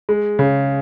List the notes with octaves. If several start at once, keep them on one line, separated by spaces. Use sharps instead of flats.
G#3
C#3